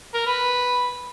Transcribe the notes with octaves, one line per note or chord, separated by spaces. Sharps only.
A#4
B4